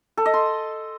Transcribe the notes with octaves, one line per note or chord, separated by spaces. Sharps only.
A4
D#5
C6